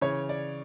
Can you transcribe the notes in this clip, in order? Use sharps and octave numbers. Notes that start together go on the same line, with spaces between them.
C#3 E3 C#5
D5